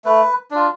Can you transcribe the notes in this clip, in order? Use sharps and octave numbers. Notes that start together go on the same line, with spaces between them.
A3 B4
D4 F4